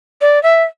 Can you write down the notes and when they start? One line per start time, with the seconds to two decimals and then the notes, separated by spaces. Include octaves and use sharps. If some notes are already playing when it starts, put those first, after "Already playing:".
0.21 D5
0.43 E5